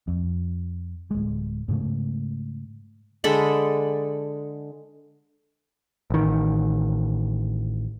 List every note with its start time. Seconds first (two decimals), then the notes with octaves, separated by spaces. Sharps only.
0.08 F2
1.11 D1 G#3
1.68 G#2 C#3 A3
3.24 D3 G#3 A4 B5
6.10 A1 D#3